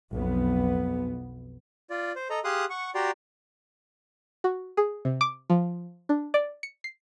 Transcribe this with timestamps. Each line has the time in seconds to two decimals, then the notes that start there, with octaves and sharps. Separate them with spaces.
0.12 B1 F2 B3
1.90 F4 D5
2.16 C5
2.30 A4 D#5 A#5
2.44 G4 G#4 F5 C6 D#6 F#6
2.70 F#5 C#6
2.95 F#4 G4 D5 G5 A#5 C6
4.44 F#4
4.77 G#4
5.05 C3
5.21 D6
5.50 F3
6.09 D4
6.34 D5
6.63 C#7
6.84 C7